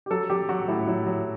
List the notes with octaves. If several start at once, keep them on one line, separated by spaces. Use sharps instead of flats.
G4
F#3 A4
F#3 G4
F#3 F#4
A2 E4
F#3 E4
F#3